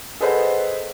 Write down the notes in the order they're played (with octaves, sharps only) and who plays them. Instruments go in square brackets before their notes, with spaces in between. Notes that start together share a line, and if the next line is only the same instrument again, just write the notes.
[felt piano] G#4 A4 B4 C5 D#5 F#5